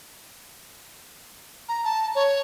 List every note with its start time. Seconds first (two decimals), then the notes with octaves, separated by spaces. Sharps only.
1.69 A#5
1.84 A5
2.15 C#5